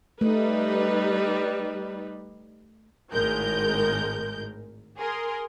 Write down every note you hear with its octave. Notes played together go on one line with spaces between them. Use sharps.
G3 A3 D#4 B4
G#1 A2 G#3 A#4 G6
G#4 A#4 C6